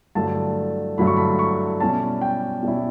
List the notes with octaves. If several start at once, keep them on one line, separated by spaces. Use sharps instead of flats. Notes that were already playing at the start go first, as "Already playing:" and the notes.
G2 D3 F#3 A3 E4 A5
G2 D3 F#3 A3 E4 B5
C#6
B5
C#6
B2 G3 C#4 E4 A5
G5
B2 G3 C#4 E4